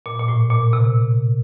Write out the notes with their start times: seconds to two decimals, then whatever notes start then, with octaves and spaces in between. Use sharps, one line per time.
0.06 A#2
0.19 A#2
0.28 A2
0.50 A#2
0.73 C3